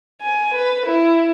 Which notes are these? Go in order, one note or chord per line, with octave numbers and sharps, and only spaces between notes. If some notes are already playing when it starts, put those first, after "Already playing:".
G#5
B4
E4